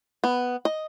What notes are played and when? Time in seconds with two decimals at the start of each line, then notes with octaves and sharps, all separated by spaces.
0.24 B3
0.65 D#5